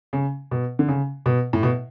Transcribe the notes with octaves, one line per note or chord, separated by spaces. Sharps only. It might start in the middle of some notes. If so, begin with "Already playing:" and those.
C#3
B2
D3
C#3
B2
A2
B2